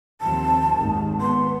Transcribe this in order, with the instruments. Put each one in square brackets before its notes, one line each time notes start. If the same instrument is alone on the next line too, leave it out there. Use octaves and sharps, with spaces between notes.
[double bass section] D#2 F3 C4 [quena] A5
[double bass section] G#1 D#2 D#3
[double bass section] B3 [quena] C6